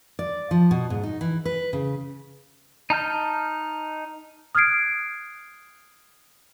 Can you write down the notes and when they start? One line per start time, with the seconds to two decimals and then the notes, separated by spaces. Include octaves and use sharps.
0.19 D5
0.51 F3
0.71 B2
0.90 G#2
1.03 D#4
1.21 E3
1.45 B4
1.73 C#3
2.90 D#4 A5 F6 G6
4.55 D#6 F6 F#6 G#6 C7 D7